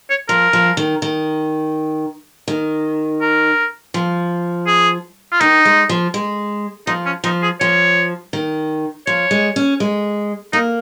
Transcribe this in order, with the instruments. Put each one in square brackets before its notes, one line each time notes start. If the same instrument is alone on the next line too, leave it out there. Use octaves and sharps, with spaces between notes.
[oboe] C#5
[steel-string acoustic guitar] F3 [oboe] A#4
[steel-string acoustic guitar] F3
D#3
D#3
D#3
[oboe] A#4
[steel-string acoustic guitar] F3
[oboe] G#4
F4
[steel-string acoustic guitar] D#3 [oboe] D#4
[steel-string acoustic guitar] G#3
F3
G#3
[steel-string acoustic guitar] F3 [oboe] D#4
[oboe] C#4
[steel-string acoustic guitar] F3 [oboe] D#4
[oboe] G#4
[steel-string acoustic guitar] F3 [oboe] C#5
[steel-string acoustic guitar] D#3
[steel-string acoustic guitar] F3 [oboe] C#5
[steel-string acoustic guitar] G#3
C#4
G#3
[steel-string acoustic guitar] A#3 [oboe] D#4